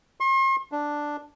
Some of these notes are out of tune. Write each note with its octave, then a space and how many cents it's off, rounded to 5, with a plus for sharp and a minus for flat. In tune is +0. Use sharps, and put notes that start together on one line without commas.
C6 +45
D4 +0